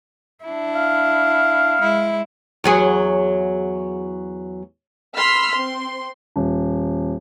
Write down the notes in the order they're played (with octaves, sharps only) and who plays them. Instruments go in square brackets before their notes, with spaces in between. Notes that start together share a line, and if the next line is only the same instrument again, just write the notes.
[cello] D4 E4
[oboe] F5
[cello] G#3 E4
[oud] E2 F#3 G#4
[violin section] B5 C6 E6 F6 B6
C4 C6
[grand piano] D#1